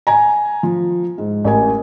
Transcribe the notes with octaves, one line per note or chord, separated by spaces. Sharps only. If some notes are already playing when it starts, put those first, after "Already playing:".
G#5 A#5
F3
G#2
A1 A#4 G#5